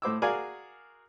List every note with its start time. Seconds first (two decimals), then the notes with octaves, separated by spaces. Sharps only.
0.02 A2 C5 D6 E6
0.22 F#4 G#4 A#4 D5 F5 G#5